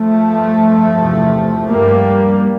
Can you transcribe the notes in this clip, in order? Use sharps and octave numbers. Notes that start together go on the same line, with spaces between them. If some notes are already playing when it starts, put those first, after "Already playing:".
Already playing: F3 A3
G2
E2 C3
G2 G3 A#3